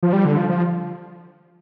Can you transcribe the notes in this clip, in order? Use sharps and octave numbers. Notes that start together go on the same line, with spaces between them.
F3
G3
D3
F3
F3